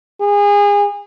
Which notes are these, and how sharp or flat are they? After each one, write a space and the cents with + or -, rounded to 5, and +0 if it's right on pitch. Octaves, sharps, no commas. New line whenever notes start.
G#4 -30